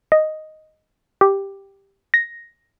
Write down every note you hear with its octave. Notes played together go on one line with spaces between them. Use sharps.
D#5
G4
A#6